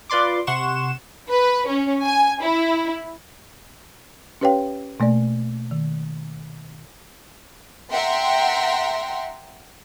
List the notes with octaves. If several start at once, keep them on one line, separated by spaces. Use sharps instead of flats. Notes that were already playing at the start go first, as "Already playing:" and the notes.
F4 B4 D5 C6 D6
C3 F#5 C6 C#6 E7
B4
C#4
G#5
E4
C#4 G4 B4 C#5 F5 G5
B2 A3 A#3 D5
D#3
E5 F#5 G5 A#5 C6